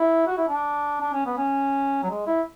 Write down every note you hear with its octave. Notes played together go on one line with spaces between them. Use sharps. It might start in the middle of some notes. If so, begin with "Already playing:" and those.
Already playing: E4
F#4
E4
D4
D4
C#4
B3
C#4
F#3
G#3
E4